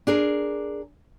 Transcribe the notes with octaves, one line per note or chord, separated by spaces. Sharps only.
D4 G#4 A#4